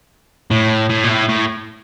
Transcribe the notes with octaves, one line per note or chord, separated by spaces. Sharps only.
A2
A2
A#2
A2
A2